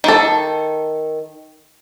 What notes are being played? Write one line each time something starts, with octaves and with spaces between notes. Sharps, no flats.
D#3 A4